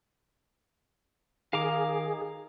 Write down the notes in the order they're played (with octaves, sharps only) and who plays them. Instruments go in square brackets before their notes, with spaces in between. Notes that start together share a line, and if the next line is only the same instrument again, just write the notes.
[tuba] D#3 [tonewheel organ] G#4 [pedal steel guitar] F5 A#5 D6